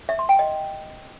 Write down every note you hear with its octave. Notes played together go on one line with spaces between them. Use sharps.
E5
C6
G5
D#5